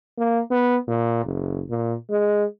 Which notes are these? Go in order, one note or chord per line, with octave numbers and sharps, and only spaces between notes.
A#3
B3
A#2
F#1
A#2
G#3